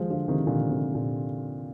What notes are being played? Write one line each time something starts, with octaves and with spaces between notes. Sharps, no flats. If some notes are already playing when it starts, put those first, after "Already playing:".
Already playing: F3 G#3
D3 F3
C3 D#3
A#2 D3
C3
A#2